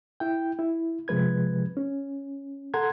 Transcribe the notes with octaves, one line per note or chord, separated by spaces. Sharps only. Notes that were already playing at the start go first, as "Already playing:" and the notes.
E4 G5
E4
C3 F3 G#3 B4 G#6
C#4
A4 F#5 A#5 C6 G#6